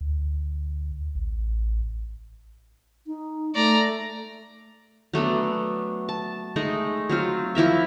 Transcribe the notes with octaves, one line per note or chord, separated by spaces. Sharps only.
D2
A1
D#4
A3 D5 A#5
F#3 A3 B3 D4
A5
G#3 A3 D#4
F#3 C4 F4
F3 E4 A#4 E5